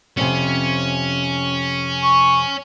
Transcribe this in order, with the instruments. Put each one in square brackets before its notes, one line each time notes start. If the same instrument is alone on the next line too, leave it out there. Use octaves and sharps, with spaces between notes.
[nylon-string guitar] F2 C3 [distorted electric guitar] C#4
[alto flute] C#6